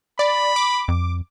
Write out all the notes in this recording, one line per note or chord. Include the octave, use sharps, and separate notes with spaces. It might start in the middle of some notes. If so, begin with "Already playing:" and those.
D5 B5
D6
F2